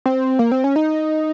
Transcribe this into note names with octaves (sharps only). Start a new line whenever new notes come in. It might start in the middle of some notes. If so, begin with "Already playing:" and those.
C4
A#3
C4
C#4
D#4